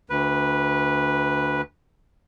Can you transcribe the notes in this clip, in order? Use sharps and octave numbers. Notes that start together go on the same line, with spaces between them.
D2 B4